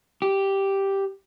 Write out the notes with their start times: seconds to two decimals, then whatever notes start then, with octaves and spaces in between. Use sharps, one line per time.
0.22 G4